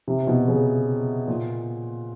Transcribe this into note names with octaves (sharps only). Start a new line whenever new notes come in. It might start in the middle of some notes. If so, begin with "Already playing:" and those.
C3
B2
C#3
A#2